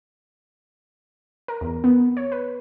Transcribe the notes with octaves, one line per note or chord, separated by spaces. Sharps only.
A#4
E2
B3
C#5
B4